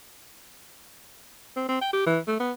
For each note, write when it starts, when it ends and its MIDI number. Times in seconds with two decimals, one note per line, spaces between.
1.56 1.64 60
1.68 1.81 60
1.81 1.91 79
1.93 2.05 67
2.06 2.19 52
2.27 2.39 57
2.40 2.52 59